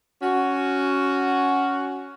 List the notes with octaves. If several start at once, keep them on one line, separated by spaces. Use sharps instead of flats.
C#4 F#4